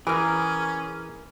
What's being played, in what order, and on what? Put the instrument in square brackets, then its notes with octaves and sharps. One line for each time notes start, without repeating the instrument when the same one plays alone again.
[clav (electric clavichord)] E3 [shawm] C#4 [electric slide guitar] G#4 [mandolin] A#4 F6